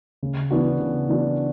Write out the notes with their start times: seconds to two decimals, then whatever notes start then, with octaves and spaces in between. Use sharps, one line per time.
0.23 C#3
0.51 E3 B3 D4 F#4
0.80 C#3
1.09 E3 B3 D4 F#4